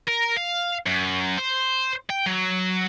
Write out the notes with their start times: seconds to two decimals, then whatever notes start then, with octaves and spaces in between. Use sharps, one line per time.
0.07 A#4
0.37 F5
0.86 F#2
1.38 C5
2.10 G5
2.26 F#3